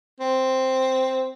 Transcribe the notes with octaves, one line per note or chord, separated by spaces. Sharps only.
C4